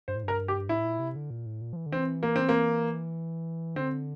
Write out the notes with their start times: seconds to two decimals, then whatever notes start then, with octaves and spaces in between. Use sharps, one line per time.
0.08 G2 C5
0.16 A2
0.24 G2 A#4
0.48 G4
0.69 A2 E4
0.84 A#2
0.99 C3
1.16 D3
1.30 A#2
1.46 A2
1.61 A#2
1.73 F3
1.76 E3
1.86 D3
1.92 E3 C4
2.23 A#3
2.36 C4
2.49 A#3
3.76 D3 C4